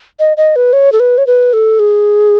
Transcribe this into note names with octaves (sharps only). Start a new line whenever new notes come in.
D#5
D#5
B4
C#5
A4
B4
C#5
B4
A4
G#4